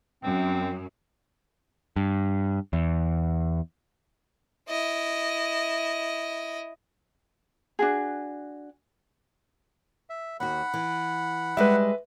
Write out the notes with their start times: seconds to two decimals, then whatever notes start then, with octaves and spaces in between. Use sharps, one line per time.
0.23 F#2 C4
1.96 G2
2.73 E2
4.69 E4 D#5
7.79 D4 F#4 G#4
10.10 E5
10.40 D#2 F#4 F#5 B5
10.74 E3
11.57 G3 G#3 B4 E5